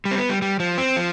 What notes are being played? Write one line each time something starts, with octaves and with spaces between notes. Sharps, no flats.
G3
C4
B3
G3
G3
F3
C4
F3